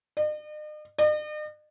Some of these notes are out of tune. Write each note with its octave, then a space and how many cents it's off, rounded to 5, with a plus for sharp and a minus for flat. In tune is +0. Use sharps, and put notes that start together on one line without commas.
D#5 -45
D#5 -45